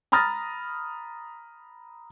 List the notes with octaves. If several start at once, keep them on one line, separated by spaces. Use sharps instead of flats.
A#5 B5 D#6 F6 A6 A#6